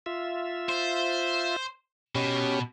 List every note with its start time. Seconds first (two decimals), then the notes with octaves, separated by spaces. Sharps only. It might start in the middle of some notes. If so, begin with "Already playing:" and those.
0.06 F4 E5
0.69 C5
2.15 B2 C#4 G4